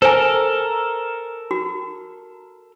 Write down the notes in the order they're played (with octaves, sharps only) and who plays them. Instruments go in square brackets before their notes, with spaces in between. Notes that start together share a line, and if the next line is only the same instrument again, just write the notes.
[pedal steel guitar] A4 A#4 [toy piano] C5 G#5
[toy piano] F#4